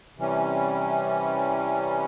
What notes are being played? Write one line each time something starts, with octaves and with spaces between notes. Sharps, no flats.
C3 E3 G3 C#4